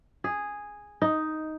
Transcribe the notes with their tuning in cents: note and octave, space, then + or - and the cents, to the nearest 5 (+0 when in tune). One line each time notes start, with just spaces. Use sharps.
G#4 -5
D#4 +5